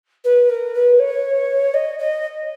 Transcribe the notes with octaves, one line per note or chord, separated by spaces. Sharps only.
B4
A#4
B4
C#5
D#5
D#5